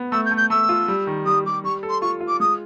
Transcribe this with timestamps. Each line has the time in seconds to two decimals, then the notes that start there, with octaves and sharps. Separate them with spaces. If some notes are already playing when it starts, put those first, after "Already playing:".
Already playing: B3
0.12 A3 E6
0.25 G6
0.31 A3
0.37 G6
0.50 A3 E6
0.69 F4
0.88 G3
1.07 D#3
1.26 G3 D#6
1.45 G3 D6
1.64 G3 C#6
1.83 A4
1.89 C6
2.01 F4 C#6
2.20 F4
2.28 D6
2.40 G#3 D#6